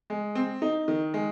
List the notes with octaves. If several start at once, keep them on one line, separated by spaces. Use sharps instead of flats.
G#3
C4
D#4
D#3
G#3